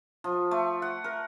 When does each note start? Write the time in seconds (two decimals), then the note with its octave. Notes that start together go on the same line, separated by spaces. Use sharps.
0.24 F3
0.51 A3
0.82 F#5
1.04 A#4